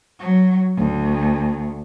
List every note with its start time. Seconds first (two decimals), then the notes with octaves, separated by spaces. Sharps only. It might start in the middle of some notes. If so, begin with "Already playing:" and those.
0.19 F#3
0.77 D2